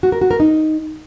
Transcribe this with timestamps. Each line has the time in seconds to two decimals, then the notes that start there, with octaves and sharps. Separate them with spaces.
0.03 F#4
0.12 A#4
0.21 F#4
0.31 A#4
0.40 D#4